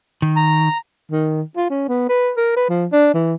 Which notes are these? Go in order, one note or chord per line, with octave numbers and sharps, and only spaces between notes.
D#3
A#5
D#3
F4
C#4
B3
B4
A#4
B4
F3
D4
E3